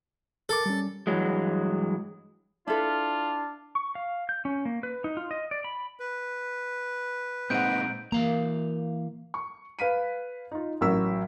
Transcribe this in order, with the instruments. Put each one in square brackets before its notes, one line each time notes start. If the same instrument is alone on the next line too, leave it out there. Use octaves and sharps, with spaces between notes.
[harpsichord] A4 [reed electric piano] A#4 D6
[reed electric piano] G3 C#4
[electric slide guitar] G2 E3 F#3 G#3
[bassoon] D4 [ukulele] E4 A4 B4 [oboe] F4
[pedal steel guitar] C#6
F5
G6
C#4
A#3
B4
D#4
F4
D#5
D5
B5
[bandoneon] B4
[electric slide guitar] A#2 G#3 D#4 [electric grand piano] C4 F#5 [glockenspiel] G6 D7 D#7
[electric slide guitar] E3 F5 A#5 [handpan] A#3
[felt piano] C#6
B4 F5 B6 D#7
D#4 F4
A1 F#3 A#4 E6 B6